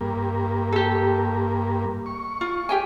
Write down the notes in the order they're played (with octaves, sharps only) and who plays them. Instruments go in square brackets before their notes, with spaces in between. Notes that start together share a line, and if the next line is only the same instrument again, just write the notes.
[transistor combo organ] G2 A#3
[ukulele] G4 A4
[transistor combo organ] C#6
[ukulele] F4
G4 G5 G#5